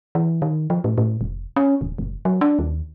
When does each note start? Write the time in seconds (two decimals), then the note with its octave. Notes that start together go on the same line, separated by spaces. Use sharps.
0.15 E3
0.42 D#3
0.70 F3
0.84 A2
0.98 A2
1.21 F1
1.56 C#4
1.81 D1
1.98 F#1
2.25 F#3
2.41 D4
2.59 D#2